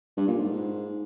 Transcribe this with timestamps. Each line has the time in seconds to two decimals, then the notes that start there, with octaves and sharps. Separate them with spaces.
0.17 G2
0.28 A#2
0.38 G#2